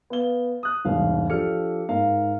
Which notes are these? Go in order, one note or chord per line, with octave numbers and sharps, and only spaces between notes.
B3 F5 G7
D#6 F#6
E1 C2 G#2 F5
F3 D4 G4 A4 F6 C#7
G#2 A#4 F5